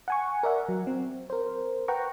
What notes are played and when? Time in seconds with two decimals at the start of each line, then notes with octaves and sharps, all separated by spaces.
0.08 F#5 G#5 C#6
0.43 A#4 D5 E5 F#5
0.69 F#3
0.87 C4
1.30 A#4 C5
1.88 B4 F#5 G5 A#5 C#6